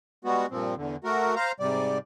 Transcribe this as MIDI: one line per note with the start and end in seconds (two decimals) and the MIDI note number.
0.25 0.46 55
0.25 0.46 56
0.25 0.46 59
0.25 0.46 66
0.51 0.75 43
0.51 0.75 46
0.51 0.75 53
0.51 0.75 60
0.76 0.96 40
0.76 0.96 50
1.04 1.35 57
1.04 1.35 66
1.04 1.35 70
1.36 1.52 72
1.36 1.52 77
1.36 1.52 82
1.60 1.98 44
1.60 1.98 48
1.60 1.98 55
1.60 1.98 74